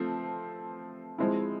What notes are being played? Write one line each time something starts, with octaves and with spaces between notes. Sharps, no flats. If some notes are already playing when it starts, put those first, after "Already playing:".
Already playing: F3 A3 C4
F3 G#3 C4 E4